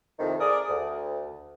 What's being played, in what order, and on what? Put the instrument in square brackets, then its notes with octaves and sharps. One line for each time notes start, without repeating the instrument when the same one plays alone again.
[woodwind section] F2 A2 C3 D#3
G#4 A#4 D5 D#6
D2